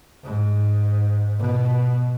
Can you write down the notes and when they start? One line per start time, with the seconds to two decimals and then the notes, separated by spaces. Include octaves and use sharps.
0.24 G#2
1.39 B2